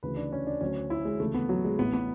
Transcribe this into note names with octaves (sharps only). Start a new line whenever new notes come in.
D2 C#3 E3 B4
D4
C#4
D4
D2 D3 F#3 C#4
E4
G#3
D2 C#3 E3 A3
B3
F#3
G#3
A1 A2 E3 B3
B3